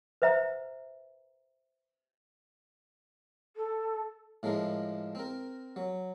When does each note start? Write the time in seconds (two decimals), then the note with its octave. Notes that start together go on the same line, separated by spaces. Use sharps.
0.22 B4 C5 E5 F#5 A#5
3.56 A4
4.43 A2 F3 G#3 A#4
5.15 C4 A#4
5.76 F#3